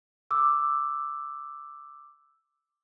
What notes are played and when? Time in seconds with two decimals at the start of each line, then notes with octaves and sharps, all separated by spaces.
0.31 D6 E6